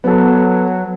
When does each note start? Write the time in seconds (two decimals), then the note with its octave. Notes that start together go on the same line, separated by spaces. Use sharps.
0.04 F#3 B3 A4